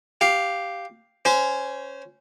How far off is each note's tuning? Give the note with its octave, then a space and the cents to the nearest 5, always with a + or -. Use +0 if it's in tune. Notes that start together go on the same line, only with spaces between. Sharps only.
G4 +0 F5 +0
C#4 +0 C5 -20